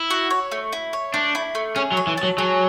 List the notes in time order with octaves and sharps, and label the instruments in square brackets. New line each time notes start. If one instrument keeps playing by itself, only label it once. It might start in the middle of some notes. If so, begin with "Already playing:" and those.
Already playing: [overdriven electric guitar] E4
[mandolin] F#4
C#5
A3
E4
C#5
[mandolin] A3 [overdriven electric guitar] D4
[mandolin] E4
A3
[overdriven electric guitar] C#4 [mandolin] G#4
[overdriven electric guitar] F#3
[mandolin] C#5
[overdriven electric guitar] E3
[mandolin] A5
[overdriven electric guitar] F#3
[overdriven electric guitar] F#3 [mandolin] G#4